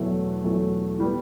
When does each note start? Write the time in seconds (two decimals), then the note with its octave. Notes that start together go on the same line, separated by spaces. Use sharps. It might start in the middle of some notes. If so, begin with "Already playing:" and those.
Already playing: E2 B2 F#3 A3
0.44 E2 B2 F#3 A3
0.98 A2 G3 B3